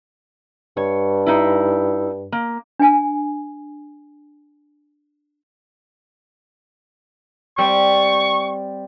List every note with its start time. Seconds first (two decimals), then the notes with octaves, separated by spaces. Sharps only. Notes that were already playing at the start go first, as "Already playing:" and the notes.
0.77 G2 C#5
1.26 D#4 E4
2.32 A#3
2.79 D4 G#5
7.58 G3 C4 C#6